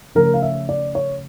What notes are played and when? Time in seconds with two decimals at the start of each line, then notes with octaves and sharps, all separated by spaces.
0.15 C#3 F3 A3 C#4 A#4
0.34 F5
0.42 E5
0.69 D5
0.95 C#5